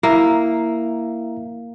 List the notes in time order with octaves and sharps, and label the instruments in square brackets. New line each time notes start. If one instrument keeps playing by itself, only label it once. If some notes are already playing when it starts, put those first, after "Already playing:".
[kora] A#3 [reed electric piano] E4 E5 A#5